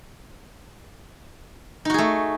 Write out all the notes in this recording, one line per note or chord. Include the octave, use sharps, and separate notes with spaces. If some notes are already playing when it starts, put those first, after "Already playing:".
A3 D#4 F#4 G#4